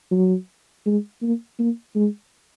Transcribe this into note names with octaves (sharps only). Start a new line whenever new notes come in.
F#3
G#3
A#3
A#3
G#3